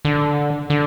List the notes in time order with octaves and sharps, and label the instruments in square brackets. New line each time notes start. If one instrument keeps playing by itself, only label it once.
[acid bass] D3
D3